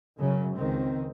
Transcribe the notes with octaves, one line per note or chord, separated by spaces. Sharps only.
F#2 C#3 F#3
C#2 D#3 C4